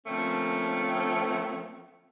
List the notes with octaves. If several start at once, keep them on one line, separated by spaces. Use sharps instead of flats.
D3 F3 A3 A#3 C4 C#4